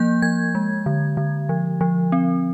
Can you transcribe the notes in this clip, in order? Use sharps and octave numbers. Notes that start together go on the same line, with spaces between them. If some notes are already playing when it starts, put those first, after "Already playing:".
Already playing: F3 A#3 G6
F3 G#6
G#3
D3
D3
F3
F3
C4